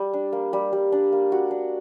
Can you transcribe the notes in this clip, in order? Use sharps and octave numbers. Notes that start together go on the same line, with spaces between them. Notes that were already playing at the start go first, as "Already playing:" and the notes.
Already playing: G3
D4
A#3
G3
G3
D4
A#3
F#4
D4